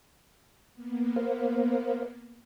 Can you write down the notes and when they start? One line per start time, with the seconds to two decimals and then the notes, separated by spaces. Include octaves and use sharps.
0.74 A#3 B3
1.16 A#4 C5 F5